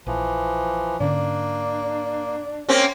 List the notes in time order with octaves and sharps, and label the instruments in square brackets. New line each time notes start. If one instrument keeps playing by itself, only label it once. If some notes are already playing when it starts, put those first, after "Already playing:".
[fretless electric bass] A#1 [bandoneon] E3 F3
[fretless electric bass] G#2 D3 C#4 [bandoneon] A#3 [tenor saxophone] D4
[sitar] A#3 C4 C#4